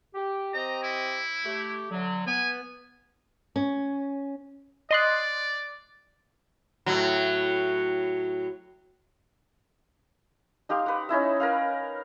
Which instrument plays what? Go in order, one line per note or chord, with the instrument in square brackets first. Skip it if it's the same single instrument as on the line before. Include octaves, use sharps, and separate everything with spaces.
[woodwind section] G4
[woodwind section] C4 G4 D#5 [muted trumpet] A#5
[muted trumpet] E4
[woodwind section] A3 G4
D3 F#3
[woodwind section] B3 [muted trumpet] G#5
[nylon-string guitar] C#4
[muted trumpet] D5 [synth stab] D#5 C6 F#6
[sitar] A2 F#3
[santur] D#4 G4 F5 C6
B4 F#5
C#4 D#4 E4 E5
A#4 B4 F5